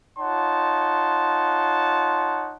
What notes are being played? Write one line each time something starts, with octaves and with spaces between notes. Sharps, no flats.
D#4 F4 C#5 F#5 A5 C6